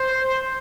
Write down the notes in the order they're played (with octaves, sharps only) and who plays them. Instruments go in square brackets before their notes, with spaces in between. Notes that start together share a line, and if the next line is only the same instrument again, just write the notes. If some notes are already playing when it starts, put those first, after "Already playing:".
Already playing: [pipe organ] C5